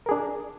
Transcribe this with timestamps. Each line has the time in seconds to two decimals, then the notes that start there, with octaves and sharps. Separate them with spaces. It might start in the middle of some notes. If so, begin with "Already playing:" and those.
0.06 A#4
0.09 G#4
0.11 D4